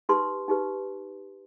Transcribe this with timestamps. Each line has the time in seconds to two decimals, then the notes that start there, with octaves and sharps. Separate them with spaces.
0.09 D#4 G4 B4 C6
0.48 D#4 G4 B4